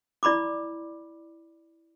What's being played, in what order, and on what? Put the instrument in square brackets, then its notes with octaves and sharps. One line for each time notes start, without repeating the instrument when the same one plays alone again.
[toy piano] E4 D5 B5 C6 D6